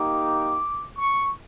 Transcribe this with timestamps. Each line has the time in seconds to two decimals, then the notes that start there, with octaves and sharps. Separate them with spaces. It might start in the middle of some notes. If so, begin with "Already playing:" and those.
Already playing: A#3 D#4 G4 D6
0.99 C#6